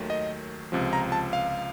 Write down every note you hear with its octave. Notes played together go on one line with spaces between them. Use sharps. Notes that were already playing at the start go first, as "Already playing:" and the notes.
Already playing: D#2 D#3 F#3 A3
D#5
C#2 C3 F3
A#5
A5
F5